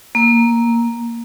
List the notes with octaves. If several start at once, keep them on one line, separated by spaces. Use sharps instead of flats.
A#3